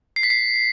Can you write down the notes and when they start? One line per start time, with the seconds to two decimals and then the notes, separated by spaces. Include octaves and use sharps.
0.16 C7
0.23 B6
0.30 C7